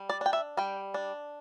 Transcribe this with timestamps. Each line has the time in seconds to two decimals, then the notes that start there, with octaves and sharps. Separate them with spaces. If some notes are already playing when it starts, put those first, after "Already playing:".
Already playing: G3
0.09 D5
0.21 D4 G5
0.33 E5
0.57 G3 G5
0.94 D4